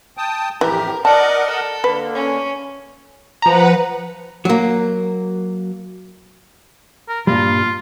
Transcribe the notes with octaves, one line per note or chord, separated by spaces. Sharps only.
G5 A5 D#6
F2 A2 E3 G4 A#4
A#4 D5 D#5 F#5 A5
A4
D3 A#3 B4
C#4
F3 B4 F#5 A#5
F#3 A#3
A#4
G2 A#2 G3 F4